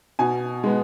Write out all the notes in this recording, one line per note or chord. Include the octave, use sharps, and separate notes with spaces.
B2 G#5
G#3 B3